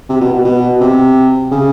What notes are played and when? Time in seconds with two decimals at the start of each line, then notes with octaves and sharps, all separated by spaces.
0.09 C3
0.21 B2
0.34 B2
0.45 B2
0.81 C3
1.51 C#3